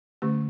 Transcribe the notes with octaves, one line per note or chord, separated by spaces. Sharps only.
D3 A3 C#4 G4